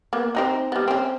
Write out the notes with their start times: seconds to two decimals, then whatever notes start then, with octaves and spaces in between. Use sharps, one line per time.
0.13 A#3 B3
0.35 C4 D#4 F#4
0.72 G3 B3
0.88 C4 C#4